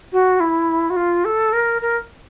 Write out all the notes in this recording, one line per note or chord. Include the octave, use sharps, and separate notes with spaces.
F#4
E4
F#4
F4
A4
A#4
A#4